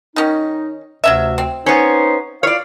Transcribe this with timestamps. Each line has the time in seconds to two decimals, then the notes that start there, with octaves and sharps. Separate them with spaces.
0.16 D#3 C#4 D#4
1.04 D2 C3 F#3 C#4 E5
1.38 C4
1.66 B3 C#4 D#4 C5
2.43 E4 F4 C#5 D5 F5